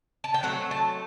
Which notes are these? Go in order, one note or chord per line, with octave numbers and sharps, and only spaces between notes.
A5
G5
F#3 A3 C4 F#5
A5